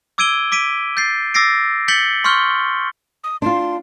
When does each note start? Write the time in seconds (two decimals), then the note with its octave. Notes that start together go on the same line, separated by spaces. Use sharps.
0.18 D6 E6 G#6 D7 D#7 G7
0.52 D6 B6 D7 D#7
0.97 G6 A6 C7
1.34 D6 E6 A6 A#6 C7 D7
1.88 G6 A6 B6 C#7 F#7 G7
2.24 C6 C#6 F6 G6 G7
3.24 D#6
3.42 D4 F4 C6